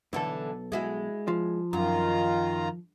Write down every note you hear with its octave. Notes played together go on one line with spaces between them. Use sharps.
B1 D3 E3 A4
G#3 E4 F#4
F3
F#2 D#3 F4 A#5